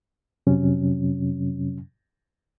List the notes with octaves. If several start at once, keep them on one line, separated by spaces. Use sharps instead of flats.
F2 C3 F#3 C#4